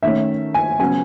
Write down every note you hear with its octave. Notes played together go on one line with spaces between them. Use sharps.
D#3 A3 C#4 E5
G#5
C#3 F#3 B3 G#5